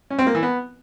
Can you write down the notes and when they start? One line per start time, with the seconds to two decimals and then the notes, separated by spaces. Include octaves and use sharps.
0.10 C#4
0.19 C4
0.27 A#3
0.35 E3
0.43 B3